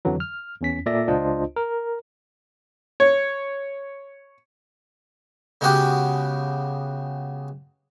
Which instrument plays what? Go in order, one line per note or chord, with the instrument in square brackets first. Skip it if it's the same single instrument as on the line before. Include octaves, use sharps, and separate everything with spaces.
[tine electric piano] F2 D3 E3 F#3
F6
E2 C#4 B6
A#2 A4 D5 E5 A#6
C#2 D4 F4 C5 D#5
A#4
[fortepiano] C#5
[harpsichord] C#3 G#3 B3 F#4 G4